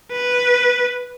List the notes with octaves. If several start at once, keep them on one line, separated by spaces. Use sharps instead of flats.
B4